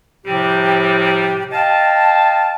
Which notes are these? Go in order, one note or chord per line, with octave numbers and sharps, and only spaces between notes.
A2 C3 F3 G3 C4 G4
D#5 F5 G5 A5